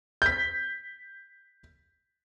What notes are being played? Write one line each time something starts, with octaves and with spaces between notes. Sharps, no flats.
G6 B6